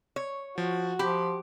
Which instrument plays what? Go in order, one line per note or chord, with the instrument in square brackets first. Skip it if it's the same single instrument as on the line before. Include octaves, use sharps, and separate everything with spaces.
[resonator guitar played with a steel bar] C#5
[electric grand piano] F3 [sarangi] F#4
[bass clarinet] F3 [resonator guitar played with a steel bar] G4 [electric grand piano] B5